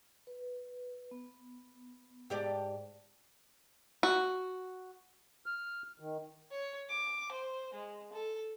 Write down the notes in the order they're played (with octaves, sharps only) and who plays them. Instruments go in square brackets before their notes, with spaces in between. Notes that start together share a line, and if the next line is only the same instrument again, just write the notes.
[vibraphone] B4
B3
[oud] G#2 G4 D5 [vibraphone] G5 A5
[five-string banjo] F#4
[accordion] F6
D#3
[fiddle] C#5
D6
C5
G#3
A4